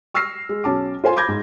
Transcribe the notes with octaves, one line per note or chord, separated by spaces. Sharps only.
C#6 E6 F6 A#6 C7
G#3
B1 C#4 A5 D6
F4 C5 G#5 C6
B5 D6 G6 G#6 A#6
G#2